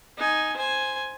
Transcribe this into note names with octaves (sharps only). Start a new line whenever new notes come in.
D#4 G#5
C5 G#5